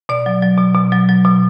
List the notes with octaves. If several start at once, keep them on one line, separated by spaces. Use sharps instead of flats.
B2 D5
F#3
F#3
B2
B2
F#3
F#3
B2